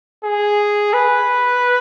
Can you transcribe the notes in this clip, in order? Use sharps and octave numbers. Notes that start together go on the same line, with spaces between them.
G#4
B4